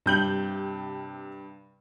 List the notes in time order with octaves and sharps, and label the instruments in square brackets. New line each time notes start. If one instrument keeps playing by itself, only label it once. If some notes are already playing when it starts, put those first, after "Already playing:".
[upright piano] G2 [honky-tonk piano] C3 G6 F#7